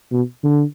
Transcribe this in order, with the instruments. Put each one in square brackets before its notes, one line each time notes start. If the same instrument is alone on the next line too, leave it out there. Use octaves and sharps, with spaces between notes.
[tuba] B2
D3